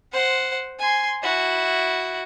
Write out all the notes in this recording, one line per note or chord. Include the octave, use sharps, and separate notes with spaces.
C5 F#5
G#5 C6
E4 F#4